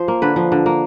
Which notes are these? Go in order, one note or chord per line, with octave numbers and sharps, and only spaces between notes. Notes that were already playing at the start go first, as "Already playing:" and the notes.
Already playing: F3 C5
A#3
D3 B4
F3
D3
A#3